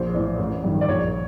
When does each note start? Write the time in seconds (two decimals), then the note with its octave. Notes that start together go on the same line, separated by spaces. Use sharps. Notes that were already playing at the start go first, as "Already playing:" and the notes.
Already playing: A#1 C5
0.14 A2 E3 D5
0.38 A1
0.64 G2 D#3
0.81 D5
0.88 A#1 C#5